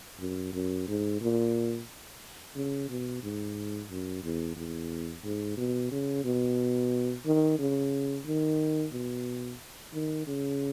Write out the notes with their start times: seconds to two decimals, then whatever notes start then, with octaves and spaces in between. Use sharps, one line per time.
0.20 F#2
0.53 F#2
0.88 G#2
1.22 A#2
2.56 C#3
2.89 B2
3.23 G#2
3.90 F#2
4.24 E2
4.56 E2
5.24 G#2
5.57 B2
5.92 C#3
6.24 B2
7.26 D#3
7.59 C#3
8.26 D#3
8.93 B2
9.93 D#3
10.27 C#3